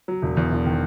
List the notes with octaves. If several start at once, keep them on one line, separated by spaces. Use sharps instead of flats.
F#3
E1
E2
E1
D#3